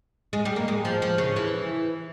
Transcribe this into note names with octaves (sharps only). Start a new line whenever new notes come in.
G#3
G3
A#3
G#3
F3
F3
C#3
E3